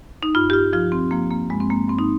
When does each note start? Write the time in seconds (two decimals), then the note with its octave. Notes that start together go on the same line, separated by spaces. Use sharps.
0.23 D#4
0.35 G2 F4
0.50 G4
0.53 F4
0.73 F3 F4
0.92 C4
1.11 F3 A#3
1.31 A#3
1.50 G2 G#3
1.60 C4
1.70 A#3
1.88 G2 C4
1.99 D#4